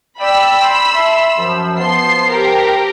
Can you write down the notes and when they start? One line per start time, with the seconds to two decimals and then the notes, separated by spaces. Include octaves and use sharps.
0.20 D5 G5 B5 E6
0.61 C6
0.94 E5 A5 C6
1.38 F#2 F3
1.78 F3 B3 A5 C6 C7
2.30 G4 A#4